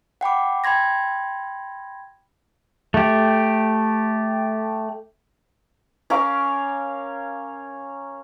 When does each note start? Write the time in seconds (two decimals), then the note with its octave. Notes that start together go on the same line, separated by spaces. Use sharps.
0.21 F#5 G5 B5 D6
0.64 G5 B5 C6 G#6 A#6
2.94 A3 G4
6.10 C#4 A#4 F5 D6